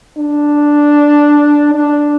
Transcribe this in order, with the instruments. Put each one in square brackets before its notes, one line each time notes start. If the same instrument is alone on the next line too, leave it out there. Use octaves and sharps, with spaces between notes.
[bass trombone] D4
D4